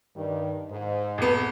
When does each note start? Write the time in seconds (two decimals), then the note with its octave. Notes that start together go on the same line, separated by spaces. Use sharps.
0.15 G2 D#3 G3
0.70 G#2
1.18 D#1 B3